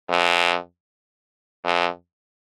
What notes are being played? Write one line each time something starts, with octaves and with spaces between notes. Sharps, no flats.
F2
F2